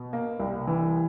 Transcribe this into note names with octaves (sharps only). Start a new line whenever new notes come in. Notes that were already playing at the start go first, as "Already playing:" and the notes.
Already playing: B2
A#3
C2
E3